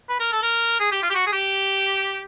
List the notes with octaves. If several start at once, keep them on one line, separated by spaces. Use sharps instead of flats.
B4
A#4
A4
A#4
G#4
G4
F4
G4
F#4
G#4
G4